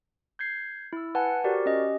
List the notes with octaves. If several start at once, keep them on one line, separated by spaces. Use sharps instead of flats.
G6 G#6 C7
E4 E6
B4 F#5 G#5 A5
F#4 G4 A#4 C5 D5
C#4 G4 D#5